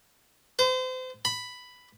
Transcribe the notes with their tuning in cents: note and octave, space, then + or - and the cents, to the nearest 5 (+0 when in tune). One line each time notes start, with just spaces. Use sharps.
C5 -35
B5 +5